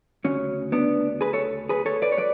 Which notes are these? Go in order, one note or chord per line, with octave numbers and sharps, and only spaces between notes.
D2 C#3 F#3 C#4
B3 D4
G#4 B4
A4 C#5
G#4 B4
A4 C#5
B4 D5
C#5
F#3 B4 D5